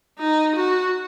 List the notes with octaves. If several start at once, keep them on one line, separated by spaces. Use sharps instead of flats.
D#4
F#4